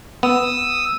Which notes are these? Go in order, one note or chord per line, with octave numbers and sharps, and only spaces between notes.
B3 D#6 E6